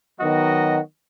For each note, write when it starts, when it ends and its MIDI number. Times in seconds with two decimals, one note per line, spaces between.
0.20 0.80 51
0.20 0.80 54
0.20 0.80 59
0.20 0.80 66
0.20 0.80 75